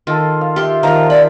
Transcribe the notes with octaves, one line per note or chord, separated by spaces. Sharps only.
D#3 F4 A4
F5
F4 G4 E5 C6
D#3 F3 F4 A#4 A#5
D5 B5